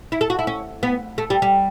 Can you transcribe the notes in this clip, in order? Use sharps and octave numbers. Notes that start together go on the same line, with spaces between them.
E4
A4
F#4
E4
C#4
B3
A3
G3
G3